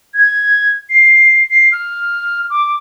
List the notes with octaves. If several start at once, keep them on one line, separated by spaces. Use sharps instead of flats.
G#6
C7
C7
F6
D6